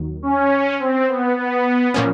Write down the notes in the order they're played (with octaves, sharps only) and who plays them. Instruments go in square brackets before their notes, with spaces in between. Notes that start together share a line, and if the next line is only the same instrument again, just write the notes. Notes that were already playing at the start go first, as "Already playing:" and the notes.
Already playing: [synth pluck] D#2 D#3 F#3
[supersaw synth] C#4
C4
B3
B3
[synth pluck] A#2 F3 A#3 C#4